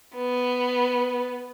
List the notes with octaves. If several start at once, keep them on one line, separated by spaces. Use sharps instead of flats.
B3